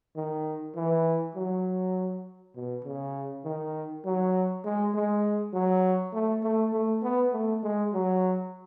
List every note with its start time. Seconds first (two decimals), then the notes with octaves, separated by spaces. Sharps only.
0.16 D#3
0.75 E3
1.35 F#3
2.55 B2
2.85 C#3
3.45 D#3
4.05 F#3
4.64 G#3
4.95 G#3
5.53 F#3
6.13 A3
6.43 A3
6.73 A3
7.03 B3
7.32 A3
7.63 G#3
7.93 F#3